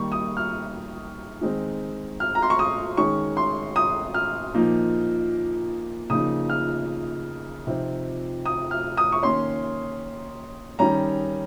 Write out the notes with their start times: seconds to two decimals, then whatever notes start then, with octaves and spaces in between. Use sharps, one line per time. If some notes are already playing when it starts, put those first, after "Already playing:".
Already playing: D#3 G3 A#3 D#4 C#6
0.12 D#6
0.37 F6
1.41 D#3 G#3 C4 D#4
2.20 F6
2.35 A#5
2.42 C6
2.50 C#6
2.59 D#6
2.97 D#3 G#3 C#4 C#6
3.37 C6
3.76 D#6
4.14 F6
4.54 A#2 F3 A#3 D#4
6.10 C#3 F3 A#3 D#4 D#6
6.49 F6
7.67 C3 F3 C4 D#4
8.46 D#6
8.71 F6
8.97 D#6
9.12 C#6
9.22 D#3 A#3 C#4 C6
10.79 D#3 G3 C#4 A#5